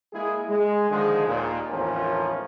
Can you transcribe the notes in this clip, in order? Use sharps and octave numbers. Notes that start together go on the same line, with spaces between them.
G#3 A#3 E4 G#4
G#3
D3 D#3 F3 G#3
D#2 A#2
G#1 E2 A2 F3 C#4 A#4